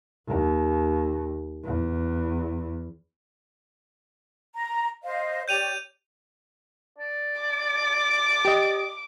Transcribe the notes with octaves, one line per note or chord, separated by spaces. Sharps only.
D#2
E2
A#5
C5 D#5 F5
G4 C#5 D5 G6 D#7 F7
D5
D6
G4 D#5